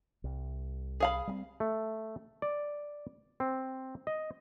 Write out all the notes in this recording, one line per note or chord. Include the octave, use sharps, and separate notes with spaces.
C2
G#4 F5 B5
G3 A#3 C4
A3
D5
C4
D#5